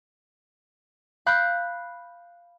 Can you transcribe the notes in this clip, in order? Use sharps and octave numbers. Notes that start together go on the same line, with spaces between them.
F5 B5 F#6 G6